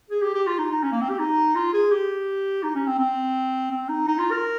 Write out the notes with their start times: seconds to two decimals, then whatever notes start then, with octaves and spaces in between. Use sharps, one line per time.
0.10 G#4
0.22 G4
0.34 G4
0.47 F4
0.58 D#4
0.71 D#4
0.83 C#4
0.92 A#3
1.01 C4
1.09 G4
1.19 D#4
1.55 F4
1.73 G#4
1.91 G4
2.63 D#4
2.75 C#4
2.87 C4
2.99 C4
3.71 C4
3.89 D#4
4.07 D#4
4.19 F4
4.31 A#4